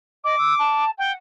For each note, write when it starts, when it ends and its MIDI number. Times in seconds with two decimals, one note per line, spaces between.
0.24 0.35 75
0.24 0.85 86
0.38 0.54 88
0.58 0.90 81
0.98 1.15 78
0.98 1.12 79